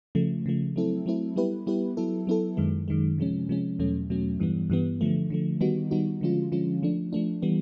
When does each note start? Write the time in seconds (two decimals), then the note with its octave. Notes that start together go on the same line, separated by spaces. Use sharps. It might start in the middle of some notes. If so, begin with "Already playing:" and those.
0.15 C#3 F3 A3
0.46 C#3 F3 A3
0.76 F#3 A3 C4 E4 A4
1.06 F#3 A3 C4 E4 A4
1.36 G3 B3 E4 G4 B4
1.67 G3 B3 E4 G4 B4
1.97 F#3 B3 E4 A4
2.27 F#3 B3 E4 A4
2.57 F#2 D#3 G#3
2.88 F#2 D#3 G#3
3.18 C3 F3 G#3 C#4
3.49 C3 F3 G#3 C#4
3.79 E2 B2 F#3 A3 C#4
4.10 E2 B2 F#3 A3 C#4
4.40 G2 E3 G3 B3
4.70 G2 E3 G3 B3
5.01 D3 F3 A3
5.30 D3 F3 A3
5.61 D#3 G3 B3 D#4 F#4
5.91 D#3 G3 B3 D#4 F#4
6.21 D3 F3 G#3 C#4 F4
6.52 D3 F3 G#3 C#4 F4
6.83 F3 A3 D4
7.13 F3 A3 D4
7.42 E3 G3 B3